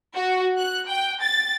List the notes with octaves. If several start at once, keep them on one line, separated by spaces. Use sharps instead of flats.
F#4
F#6
G5
A6